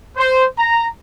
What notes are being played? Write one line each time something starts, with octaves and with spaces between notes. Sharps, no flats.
C5
A#5